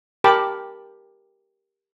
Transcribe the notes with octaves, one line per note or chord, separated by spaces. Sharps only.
G4 A#4 G5 A5 B5 D6